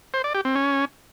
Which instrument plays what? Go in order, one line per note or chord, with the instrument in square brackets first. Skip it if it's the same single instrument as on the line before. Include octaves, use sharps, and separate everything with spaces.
[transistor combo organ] C5
D5
G4
C4
C#4